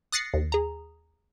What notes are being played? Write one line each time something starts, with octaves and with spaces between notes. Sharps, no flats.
D#6 F#6 A6 A#6 C7 C#7
D#2
G#4 A#5